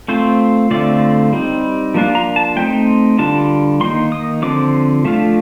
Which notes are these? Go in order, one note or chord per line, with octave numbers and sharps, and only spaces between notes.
A3 C4 F4 C5
D3 A3 C4 F4 D5
G3 C4 D#4
F3 A#3 D4 F4
A#5
A5
A3 C4 D#4 G5
D3 G3 D4 F4 A5
D#3 A#3 D#4 C6
D#6
D3 F3 C4 D6
F3 A3 D4 F4